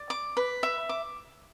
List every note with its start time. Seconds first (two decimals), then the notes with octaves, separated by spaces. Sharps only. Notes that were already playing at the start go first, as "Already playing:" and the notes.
Already playing: D5
0.10 D6
0.37 B4
0.63 E5
0.89 D6